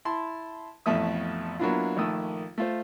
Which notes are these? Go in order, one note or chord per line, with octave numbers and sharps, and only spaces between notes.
E4 A5 C6
A1 F2 B2 A3 E5 D#6
F#3 A#3 B3 D4 E4 F4
A#1 D#3 A3 D#6 E6
A3 F4 C5